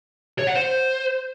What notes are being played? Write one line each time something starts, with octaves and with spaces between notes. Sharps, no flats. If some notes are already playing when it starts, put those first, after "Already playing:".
C#5
F#5
C5